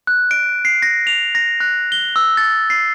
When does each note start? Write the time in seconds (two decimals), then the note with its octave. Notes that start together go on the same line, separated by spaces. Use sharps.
0.07 F#6
0.31 D7
0.65 C7
0.82 A#6
1.07 F7
1.35 A#6
1.60 F#6
1.92 G7
2.16 E6
2.37 A6
2.70 C7